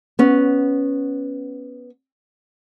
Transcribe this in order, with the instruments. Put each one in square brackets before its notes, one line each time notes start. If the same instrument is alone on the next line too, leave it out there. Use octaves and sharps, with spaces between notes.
[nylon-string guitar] B3 C#4